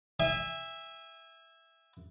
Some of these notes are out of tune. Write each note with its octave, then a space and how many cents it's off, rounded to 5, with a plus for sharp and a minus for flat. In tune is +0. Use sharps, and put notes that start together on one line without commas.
E5 +0 G#5 -35